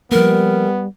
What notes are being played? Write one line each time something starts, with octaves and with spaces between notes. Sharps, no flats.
F3 G3 A#3 B3 A#4